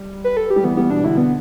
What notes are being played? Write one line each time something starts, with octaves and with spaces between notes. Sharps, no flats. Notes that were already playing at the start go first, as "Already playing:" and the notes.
Already playing: G3
B4
A4
G4
G3
E3 B3
G3 B3
B2 D4
D3 E4
B3